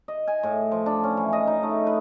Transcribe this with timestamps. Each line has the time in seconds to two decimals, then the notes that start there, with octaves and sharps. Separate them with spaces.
0.08 D#5
0.27 G#5
0.43 A2
0.72 F3
0.86 D4
1.04 C#4
1.17 E3
1.33 D#5
1.47 D#4
1.63 A3
1.87 B4